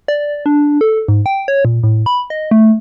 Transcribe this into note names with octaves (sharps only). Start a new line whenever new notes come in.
D5
D4
A4
G#2
G5
C#5
A#2
A2
B5
D#5
A3